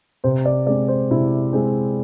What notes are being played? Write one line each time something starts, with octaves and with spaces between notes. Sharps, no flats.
C3 C5
D5
G#3 C4 D5
C5
C3 E4
G#3 C4